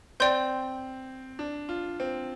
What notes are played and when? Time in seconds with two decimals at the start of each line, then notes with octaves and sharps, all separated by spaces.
0.20 C4 D5 G5 C6 G6
1.39 D4
1.69 F4
2.00 C4